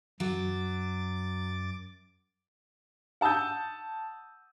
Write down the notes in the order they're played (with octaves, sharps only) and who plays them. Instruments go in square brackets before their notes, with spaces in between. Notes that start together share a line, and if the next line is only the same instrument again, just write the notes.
[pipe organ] F#2 D6 A6 [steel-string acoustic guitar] F#3
[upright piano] F#5 A5 D#6 E6 G6